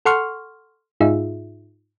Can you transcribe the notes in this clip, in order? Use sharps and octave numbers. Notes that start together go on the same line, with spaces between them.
A4 F#5 C6 C#6 F6
G#2 D#4 F4 G#4 E5